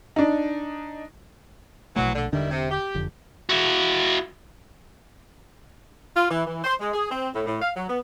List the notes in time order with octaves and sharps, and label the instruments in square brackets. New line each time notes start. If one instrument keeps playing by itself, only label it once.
[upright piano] D4 D#4
[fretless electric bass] A#1 B2 A3 [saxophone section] E3 F#3
[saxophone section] D3
[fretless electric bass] E1 D3 D4 [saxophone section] D#3 G3 E4
[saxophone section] C3
G4
[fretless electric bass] F#1 F2 D3
[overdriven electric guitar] E4 F#4
[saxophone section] F4
E3
E3
C5
G#3
G#4
C4
A2
A2
F5
F#3
B3